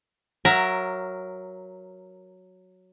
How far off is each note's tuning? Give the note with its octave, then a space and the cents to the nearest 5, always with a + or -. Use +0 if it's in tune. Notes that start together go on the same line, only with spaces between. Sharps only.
F#3 +0 A#4 +0 E5 +20